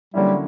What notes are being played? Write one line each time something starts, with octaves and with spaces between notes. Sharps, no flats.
D3 F#3 G3 A#3 C#4 E4